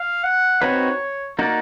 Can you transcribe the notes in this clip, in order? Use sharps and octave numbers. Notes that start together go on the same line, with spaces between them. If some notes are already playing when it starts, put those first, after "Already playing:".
Already playing: F5
F#5
C4 D#4 F#4 B4 C#5
A#3 D#4 F#4 A#4 D5